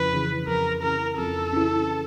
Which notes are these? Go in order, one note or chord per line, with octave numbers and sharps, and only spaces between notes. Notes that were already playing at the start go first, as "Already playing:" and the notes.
Already playing: F2 C#3 E3 B4
C#3 E3
F2 A#4
C#3 E3 A#4
F2 A4
C#3 E3